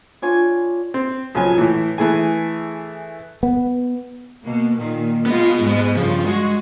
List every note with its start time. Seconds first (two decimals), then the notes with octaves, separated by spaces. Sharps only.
0.22 D4 F4 C#5 G#5
0.94 C4
1.35 C#2 F3 F#3 G#5
1.58 A2 E3
1.98 E3 A3 G#4 G#5
3.43 B3
4.44 B2 A#3
4.76 A#2 D#3
5.26 G#3 B3 F4 D#5
5.59 G#2 G#3
5.97 G2 C#3 F3
6.26 G#3 F#4